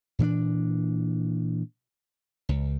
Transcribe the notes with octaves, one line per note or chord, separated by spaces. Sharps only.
A#2 E3 C4 D4
C#2